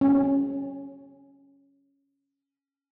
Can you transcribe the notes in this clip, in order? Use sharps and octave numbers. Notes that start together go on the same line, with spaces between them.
C#4